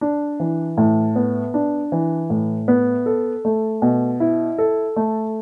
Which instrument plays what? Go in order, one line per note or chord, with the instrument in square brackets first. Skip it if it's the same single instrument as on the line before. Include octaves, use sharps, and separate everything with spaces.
[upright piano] D4
E3
A2
B3
D4
E3
A2
B3
A4
A3
B2
E4
A4
A3